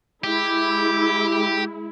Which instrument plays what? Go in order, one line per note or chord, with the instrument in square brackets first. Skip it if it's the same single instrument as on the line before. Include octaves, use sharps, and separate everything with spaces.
[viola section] G#3 E4 [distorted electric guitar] G4